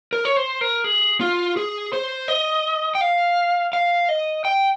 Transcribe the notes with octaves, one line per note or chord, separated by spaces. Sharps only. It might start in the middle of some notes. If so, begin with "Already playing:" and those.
A#4
C#5
C5
A#4
G#4
F4
G#4
C5
D#5
G5
F5
F5
D#5
G5